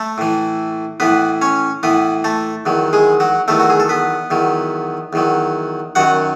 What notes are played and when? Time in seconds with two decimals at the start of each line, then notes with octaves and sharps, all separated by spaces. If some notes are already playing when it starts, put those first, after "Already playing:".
Already playing: A3 A4
0.18 A2 E3
1.00 A2 E3 B3 B4
1.41 C#4 C#5
1.83 A2 E3 B3 B4
2.24 A3 A4
2.66 E2 D#3 F#3
2.93 G#3 G#4
3.20 F#3 F#4
3.48 E2 D#3 F#3 A3 A4
3.60 F#4
3.70 G#4
3.80 A4
3.89 B3 B4
4.30 E2 D#3 F#3
5.13 E2 D#3 F#3
5.95 F#2 D#3 F#3 F#4 F#5